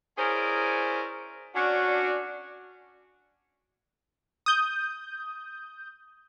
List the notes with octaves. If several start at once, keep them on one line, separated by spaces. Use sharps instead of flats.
C#4 E4 G#4 A#4 C5 D5
C#4 D4 F#4
D#6 G6